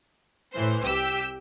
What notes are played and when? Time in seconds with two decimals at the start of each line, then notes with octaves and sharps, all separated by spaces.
0.54 A2 E3 C5
0.85 C2 G4 G5 E6 B6